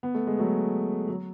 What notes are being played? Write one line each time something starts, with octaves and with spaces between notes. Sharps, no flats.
B3
A3
G#3
F#3 A3
F#3